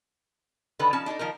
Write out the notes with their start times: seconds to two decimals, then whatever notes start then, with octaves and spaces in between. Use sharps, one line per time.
0.79 D3 D#3 A4 B4
0.93 F3 C#4 D#4 A5
1.06 D4 D#4 G#4 A4
1.19 D#3 F3 D#4 A#4